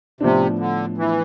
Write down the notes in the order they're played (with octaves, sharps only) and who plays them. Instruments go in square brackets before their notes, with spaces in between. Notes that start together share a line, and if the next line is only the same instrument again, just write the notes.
[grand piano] A2 F3 B3 D4 [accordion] C3
[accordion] D3
E3